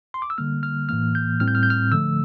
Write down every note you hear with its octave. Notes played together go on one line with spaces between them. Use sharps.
C6
D6
E6
D3 G3 A#3 F6
F6
A2 E3 A#3 F6
G6
A2 G3 C4 F6
G6
F6
G6
F6
D3 F3 A3 E6